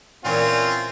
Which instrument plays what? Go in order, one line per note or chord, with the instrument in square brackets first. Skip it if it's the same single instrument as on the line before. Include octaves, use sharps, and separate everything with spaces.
[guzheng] A#2 E3 [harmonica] C4 C#4 F4